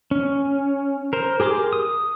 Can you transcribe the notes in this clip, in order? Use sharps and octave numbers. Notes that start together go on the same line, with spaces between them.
C#4
A#4 C5
G4 G#4 A#4 C6 D6
D#6